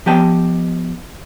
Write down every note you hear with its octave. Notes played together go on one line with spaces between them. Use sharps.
F3 B3 G4 D#5 G5 A5